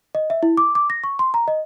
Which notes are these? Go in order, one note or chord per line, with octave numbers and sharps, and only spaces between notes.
D#5
E5
E4
D6
D6
A#6
C#6
C6
A#5
D#5